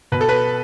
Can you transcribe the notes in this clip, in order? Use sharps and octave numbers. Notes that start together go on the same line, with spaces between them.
B2 B4
A4
B4